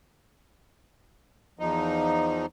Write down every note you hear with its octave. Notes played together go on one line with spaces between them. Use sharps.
E2 F3 D#4